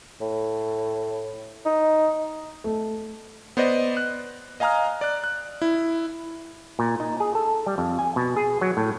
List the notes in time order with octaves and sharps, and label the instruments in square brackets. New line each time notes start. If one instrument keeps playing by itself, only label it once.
[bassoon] A2
D#4
[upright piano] A3
[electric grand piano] B3 C5 D5 D#5
F#6
D#5 F5 G#5 A#5 D#6 F6
D5 F#6
F#6
E4
[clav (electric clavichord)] A#2
D#4
G#4
A4
G3
F2
G#5
B2
G#4
F#3
A2